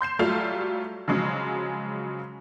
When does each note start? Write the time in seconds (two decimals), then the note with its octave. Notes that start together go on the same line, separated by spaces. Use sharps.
0.01 C6 G6 C7 E7
0.19 F#3 G3 A3 F4 F7
1.08 C#3 F3 F#3 G#3